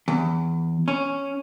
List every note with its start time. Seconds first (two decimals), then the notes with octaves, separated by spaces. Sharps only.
0.08 E2
0.88 C#4